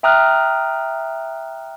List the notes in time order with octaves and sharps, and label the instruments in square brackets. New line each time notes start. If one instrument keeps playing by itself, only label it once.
[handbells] E5 G5 A#5 D#6 F6 F#6